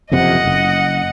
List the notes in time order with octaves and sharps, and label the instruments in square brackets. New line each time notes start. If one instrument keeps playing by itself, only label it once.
[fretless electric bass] F#1 F2 C3 [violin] D#5 F#5
[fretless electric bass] F#1